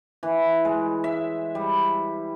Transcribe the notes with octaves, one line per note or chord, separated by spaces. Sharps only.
E3
G#3
E5
G3